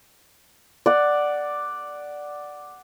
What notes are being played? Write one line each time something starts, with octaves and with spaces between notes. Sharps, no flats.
D5 F#5